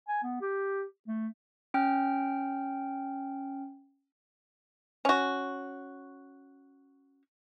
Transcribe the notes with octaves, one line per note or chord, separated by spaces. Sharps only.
G#5
B3
G4
A3
C#4 G5 F6
C#4 F#4